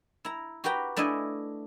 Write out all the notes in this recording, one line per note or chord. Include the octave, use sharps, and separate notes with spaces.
E4 A#5
F#4 G4 B4 G5 A#5
A3 D4 E4 D#5 E5 G#5